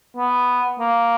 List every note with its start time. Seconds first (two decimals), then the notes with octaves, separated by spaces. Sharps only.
0.17 B3
0.80 A#3